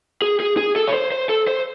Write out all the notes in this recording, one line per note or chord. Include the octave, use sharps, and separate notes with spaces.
G#4
G#4
G#4
A4
C#5
C5
C5
A4
C5